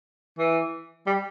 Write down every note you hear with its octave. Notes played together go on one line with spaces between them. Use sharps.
E3
G3